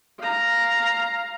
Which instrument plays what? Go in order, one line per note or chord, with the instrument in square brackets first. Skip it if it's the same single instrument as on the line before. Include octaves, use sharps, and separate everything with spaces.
[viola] F5 A#5